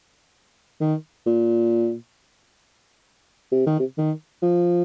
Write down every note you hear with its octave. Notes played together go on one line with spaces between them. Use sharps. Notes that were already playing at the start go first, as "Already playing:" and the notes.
D#3
A#2
C3
D#3
C3
D#3
F3